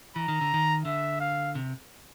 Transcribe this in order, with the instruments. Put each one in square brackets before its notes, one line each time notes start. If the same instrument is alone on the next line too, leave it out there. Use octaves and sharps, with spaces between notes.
[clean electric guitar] E3 [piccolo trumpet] A#5
[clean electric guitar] D#3
D3
D#3
[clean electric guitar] D3 [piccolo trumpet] E5
[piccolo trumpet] F5
[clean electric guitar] C3